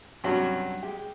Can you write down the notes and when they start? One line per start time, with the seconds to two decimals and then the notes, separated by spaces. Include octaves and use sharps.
0.24 G2 C3 F#3 C#4 F#4
0.83 G#3 G4